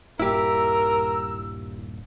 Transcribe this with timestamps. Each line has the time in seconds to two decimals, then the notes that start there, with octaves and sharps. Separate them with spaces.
0.19 D#1 G2 A#2 E4 G4 A#4 E6